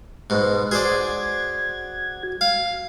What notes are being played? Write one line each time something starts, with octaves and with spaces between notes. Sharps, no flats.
G#2 B2
F#4 G#4 C5 D5 G#6
F5